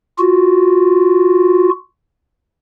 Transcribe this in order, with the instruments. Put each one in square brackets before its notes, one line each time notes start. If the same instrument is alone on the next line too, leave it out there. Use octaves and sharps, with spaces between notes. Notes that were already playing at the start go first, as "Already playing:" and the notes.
[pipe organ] F4 F#4